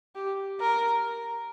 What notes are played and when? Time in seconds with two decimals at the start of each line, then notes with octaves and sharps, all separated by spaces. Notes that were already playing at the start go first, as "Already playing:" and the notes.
0.15 G4
0.60 A#4